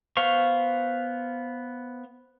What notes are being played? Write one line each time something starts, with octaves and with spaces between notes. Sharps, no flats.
B3 C5 F5 C#6